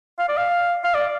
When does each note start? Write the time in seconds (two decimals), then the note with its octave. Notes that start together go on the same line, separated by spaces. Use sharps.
0.19 F5
0.29 D5
0.38 F5
0.84 F5
0.95 D5